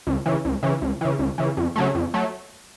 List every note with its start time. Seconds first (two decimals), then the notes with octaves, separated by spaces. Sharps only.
0.07 C#2
0.26 C#3 E3
0.45 C#2
0.63 C#3 E3
0.82 C#2
1.01 C#3 E3
1.19 C#2
1.38 C#3 E3
1.57 F2
1.76 C#3 F#3 A3
1.95 F2
2.14 F#3 A3